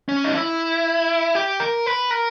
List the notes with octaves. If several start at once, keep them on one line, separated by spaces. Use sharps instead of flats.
C#4
D#4
E4
G4
A#4
B4
A#4